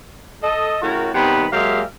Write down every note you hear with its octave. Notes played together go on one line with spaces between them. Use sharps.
A4 D#5
A2 C#3 F#4 A#4
C3 D#3 G3 B3 B4 B5
F#3 G#3 A#3 G4 E5 F5